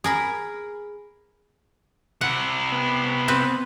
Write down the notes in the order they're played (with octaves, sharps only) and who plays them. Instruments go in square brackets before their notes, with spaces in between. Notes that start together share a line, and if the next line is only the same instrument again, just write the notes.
[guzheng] G#4 A#4 B5
[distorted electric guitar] C3 E4 [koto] F#5
[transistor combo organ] B3
[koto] C4 B4